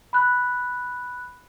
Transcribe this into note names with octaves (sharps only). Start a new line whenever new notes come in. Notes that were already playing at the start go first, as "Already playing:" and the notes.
B5 F#6